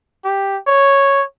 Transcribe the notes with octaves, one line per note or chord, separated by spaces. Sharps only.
G4
C#5